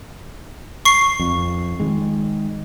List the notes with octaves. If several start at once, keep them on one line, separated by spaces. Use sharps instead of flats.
C#6 C7
F2
D#3 G#3